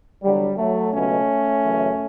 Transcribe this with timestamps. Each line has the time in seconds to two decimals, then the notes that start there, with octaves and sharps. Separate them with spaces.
0.23 E2 D3 F#3 G3
0.57 F#3 A3
0.93 C#2 B2 F#3 A3 C#4
1.63 F#2 C#3 E3